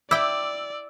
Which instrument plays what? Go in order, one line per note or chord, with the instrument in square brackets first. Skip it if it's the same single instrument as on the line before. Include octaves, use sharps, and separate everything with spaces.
[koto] E4 G5 [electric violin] D5 [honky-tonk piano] D6 E6